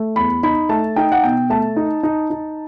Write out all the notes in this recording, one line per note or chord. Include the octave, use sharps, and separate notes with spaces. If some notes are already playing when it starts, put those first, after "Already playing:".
Already playing: A3
E2 B5
D#4 B5
A3 A5
D#4 G5
F#5
B2 G5
A3 A5
D#4
D#4
D#4